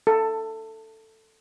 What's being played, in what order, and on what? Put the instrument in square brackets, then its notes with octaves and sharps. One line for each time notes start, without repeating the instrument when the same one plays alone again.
[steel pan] A4